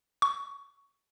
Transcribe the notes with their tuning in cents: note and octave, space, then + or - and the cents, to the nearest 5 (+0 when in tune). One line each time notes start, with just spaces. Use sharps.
C#6 +15